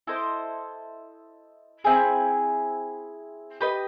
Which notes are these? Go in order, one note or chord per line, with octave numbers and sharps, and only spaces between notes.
E4 A4 C5 D#5
C4 E4 G#4
G4 B4 D#5